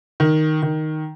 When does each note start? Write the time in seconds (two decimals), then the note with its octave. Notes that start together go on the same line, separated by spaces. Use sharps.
0.20 D#3
0.63 D#3